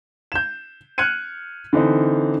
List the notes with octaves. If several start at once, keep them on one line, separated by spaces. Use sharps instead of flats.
G6 E7
F6 F#6 G#6 C#7 D#7
D3 E3 C4 D#4